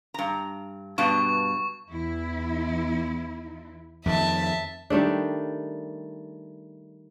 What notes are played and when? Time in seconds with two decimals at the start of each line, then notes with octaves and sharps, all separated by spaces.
0.14 G2 A#5
0.98 G2 B2 A5 C#6
1.89 E2 E4
4.06 F2 D#3 E5 A5
4.90 D#3 G3 A3 D4